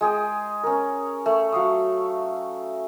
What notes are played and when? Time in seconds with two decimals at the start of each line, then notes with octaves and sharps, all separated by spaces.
0.01 G#3 G#4 G5 D#6
0.63 C#4 A#4
1.26 A3
1.52 F#3 F5 D#6